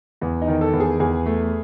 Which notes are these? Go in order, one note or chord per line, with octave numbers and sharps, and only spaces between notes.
E2
D#4
D#3
A4
E2
G#4
E2 G#4
A3